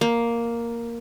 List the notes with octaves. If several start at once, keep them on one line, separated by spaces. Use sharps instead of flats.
A#3